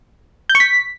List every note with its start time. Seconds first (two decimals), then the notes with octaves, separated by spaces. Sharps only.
0.49 G6
0.55 C#6
0.60 B6